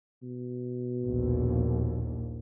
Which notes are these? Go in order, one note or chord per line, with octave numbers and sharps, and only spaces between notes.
B2
A#1 D#2